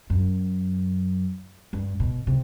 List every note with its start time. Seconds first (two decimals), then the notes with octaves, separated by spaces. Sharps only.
0.10 F#2
1.73 G2
2.00 B2
2.27 C3